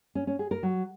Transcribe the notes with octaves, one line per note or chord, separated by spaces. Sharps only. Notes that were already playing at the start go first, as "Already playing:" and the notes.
C#4
C#4
G#4
A#4
F#3